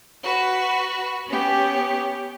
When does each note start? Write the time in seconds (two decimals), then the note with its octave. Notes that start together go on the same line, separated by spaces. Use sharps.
0.23 F#4 B4
1.28 B3 C#4 G4